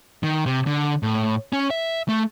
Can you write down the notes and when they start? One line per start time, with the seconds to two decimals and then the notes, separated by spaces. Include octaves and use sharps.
0.23 D#3
0.46 C3
0.67 D3
1.03 A2
1.53 C#4
1.70 E5
2.09 A3